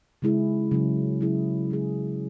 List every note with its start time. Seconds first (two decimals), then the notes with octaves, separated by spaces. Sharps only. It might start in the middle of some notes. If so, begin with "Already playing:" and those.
0.22 C#3 G#3 E4 G#4
0.71 C#3 F#3 C#4
1.21 F#3 E4 G#4
1.70 G#3 E4 G#4